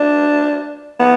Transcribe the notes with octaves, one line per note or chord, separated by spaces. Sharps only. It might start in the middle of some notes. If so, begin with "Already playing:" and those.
Already playing: D4
B3